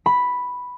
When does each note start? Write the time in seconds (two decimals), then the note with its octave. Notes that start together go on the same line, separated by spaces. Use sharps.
0.06 B5